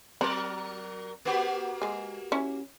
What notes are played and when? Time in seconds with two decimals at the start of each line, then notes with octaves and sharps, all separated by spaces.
0.21 F#3 C4 A#4 C5 D5 B5
1.25 A#3 F#4 G4
1.82 G#3 G#4
2.32 C#4 E4